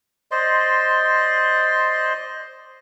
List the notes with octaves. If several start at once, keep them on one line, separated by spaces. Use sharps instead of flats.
C5 D5 D#5 C6